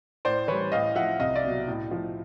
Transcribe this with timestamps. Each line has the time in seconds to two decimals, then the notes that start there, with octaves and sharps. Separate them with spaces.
0.25 A2 C5 D5
0.48 E3 G3 B4 C#5
0.72 A2 D#5 F5
0.95 F3 E5 F#5
1.20 C2 D#5 F5
1.35 D5 E5
1.44 B2 F#3
1.67 A2
1.91 F3